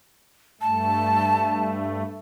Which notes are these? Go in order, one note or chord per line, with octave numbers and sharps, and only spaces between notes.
G2 A3 A5